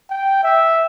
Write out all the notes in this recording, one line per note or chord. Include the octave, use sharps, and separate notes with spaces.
G5
E5